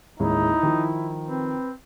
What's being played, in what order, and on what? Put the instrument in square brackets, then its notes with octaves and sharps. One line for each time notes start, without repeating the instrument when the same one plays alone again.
[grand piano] A1 D#2 G#3 [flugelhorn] D#4 [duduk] E4
[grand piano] D#3 F3
[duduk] C4 [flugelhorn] B4